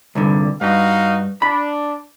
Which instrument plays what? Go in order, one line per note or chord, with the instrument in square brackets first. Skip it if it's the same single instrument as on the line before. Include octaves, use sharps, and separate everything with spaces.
[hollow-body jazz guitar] C2 G2 D3
[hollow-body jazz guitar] G2 [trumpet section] D#4 F#4 F5
[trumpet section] D4 [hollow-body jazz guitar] B5